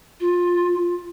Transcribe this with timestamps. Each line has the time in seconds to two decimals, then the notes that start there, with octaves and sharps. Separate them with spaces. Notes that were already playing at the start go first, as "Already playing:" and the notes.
0.20 F4